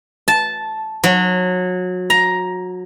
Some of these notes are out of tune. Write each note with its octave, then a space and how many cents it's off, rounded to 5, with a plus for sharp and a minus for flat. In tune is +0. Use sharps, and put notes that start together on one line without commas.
A5 -10
F#3 -25
A#5 +10